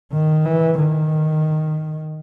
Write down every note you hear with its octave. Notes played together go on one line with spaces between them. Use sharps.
D#3
E3
D#3